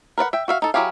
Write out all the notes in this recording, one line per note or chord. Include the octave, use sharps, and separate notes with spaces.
A#4 B4 D5 F#5
E5 G5
F#4 E5 F5
D#4 A4
F#3 E4 G4 G#4 F5